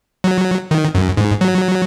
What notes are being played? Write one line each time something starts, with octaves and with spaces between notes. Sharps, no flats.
F#3
D#3
F#2
G#2
F#3